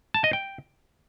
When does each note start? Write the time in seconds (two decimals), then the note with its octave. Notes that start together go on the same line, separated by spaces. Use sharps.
0.14 A5
0.24 D#5
0.33 G5